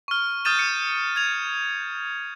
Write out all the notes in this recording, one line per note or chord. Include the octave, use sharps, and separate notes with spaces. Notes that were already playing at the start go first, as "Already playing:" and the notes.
C#6 F6
D#6 F6 G6 A6 D#7 E7
C#7
G#6 F7